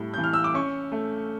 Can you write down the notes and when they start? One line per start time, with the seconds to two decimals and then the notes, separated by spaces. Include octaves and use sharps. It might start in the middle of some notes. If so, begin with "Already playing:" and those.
Already playing: A2 G3
0.14 E3 G6
0.24 F6
0.33 E6
0.44 D6
0.54 C#4 C#6
0.92 A3